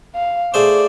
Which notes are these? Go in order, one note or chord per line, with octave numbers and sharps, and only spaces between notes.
F5
A3 G#4 C5 D5